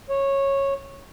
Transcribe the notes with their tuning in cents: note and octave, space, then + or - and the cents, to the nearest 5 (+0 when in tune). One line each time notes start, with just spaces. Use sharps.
C#5 -10